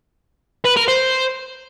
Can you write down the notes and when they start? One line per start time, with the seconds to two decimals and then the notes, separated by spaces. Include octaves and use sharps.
0.65 B4
0.77 A#4
0.88 C5